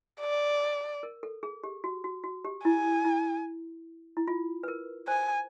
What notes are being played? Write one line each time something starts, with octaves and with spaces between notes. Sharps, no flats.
D5
A#4
A4
G#4
G4
F#4
F#4
F#4
G4
E4 G#5
E4
E4
F4
B4
A#4
C5 G#5